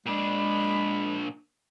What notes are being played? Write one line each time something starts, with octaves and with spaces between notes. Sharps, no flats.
A#2 G#3 D4 B5